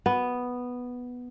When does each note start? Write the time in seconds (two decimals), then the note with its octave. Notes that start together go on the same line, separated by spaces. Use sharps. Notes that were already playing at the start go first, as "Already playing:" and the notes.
0.06 B3